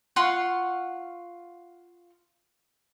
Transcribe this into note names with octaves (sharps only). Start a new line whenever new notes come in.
F4 F#5 C6 C#6